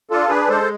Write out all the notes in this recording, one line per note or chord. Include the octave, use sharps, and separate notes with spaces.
D4 F4 A4
D4 G#4 B4
G#3 A4 C5